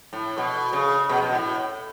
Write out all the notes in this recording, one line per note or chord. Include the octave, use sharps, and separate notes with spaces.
A2
B2
C#3
B2
B2
A2